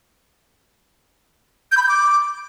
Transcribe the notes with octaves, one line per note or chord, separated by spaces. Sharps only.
G6
B5
G6
D6